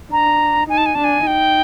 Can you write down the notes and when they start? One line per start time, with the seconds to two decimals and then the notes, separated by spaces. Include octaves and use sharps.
0.11 D4 A#5
0.69 D#4 G#5
0.77 A5
0.86 G#5
0.95 D4 A5
1.04 G#5
1.27 D#4 G5